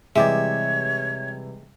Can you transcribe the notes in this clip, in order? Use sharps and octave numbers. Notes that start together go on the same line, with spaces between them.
C3 E3 G3 G#3 G4 C#5 D5 E5